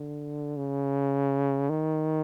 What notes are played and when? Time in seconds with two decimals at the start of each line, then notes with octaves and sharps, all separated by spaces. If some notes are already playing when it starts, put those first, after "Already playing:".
Already playing: D3
0.56 C#3
1.69 D#3